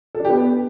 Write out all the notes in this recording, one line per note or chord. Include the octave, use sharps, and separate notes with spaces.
A4
D4
G4
B3